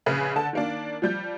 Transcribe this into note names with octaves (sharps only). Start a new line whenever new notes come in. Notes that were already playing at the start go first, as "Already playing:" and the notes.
A#1 C#3 G#4 B4 F6
D3 A4 A5
D#3 A#3 D4
F3 G3 G6